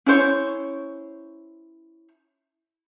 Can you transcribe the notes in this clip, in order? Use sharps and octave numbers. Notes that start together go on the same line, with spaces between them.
C#4 E4 C5 C#5